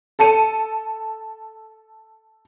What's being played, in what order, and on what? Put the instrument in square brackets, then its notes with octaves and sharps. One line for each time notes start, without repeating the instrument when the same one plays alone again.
[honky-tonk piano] A4 A5 C#7 D#7